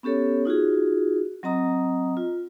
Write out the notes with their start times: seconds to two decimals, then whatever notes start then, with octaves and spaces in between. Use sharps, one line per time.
0.03 B3 C#4 G4 A4 C#5
0.45 D#4 F4 F#4 G#4
1.43 F#3 C4 D#5 A#5 D#6
2.17 F4